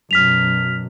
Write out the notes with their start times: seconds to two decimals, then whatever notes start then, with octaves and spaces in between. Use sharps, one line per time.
0.11 F#2 B2 F6 B6 F7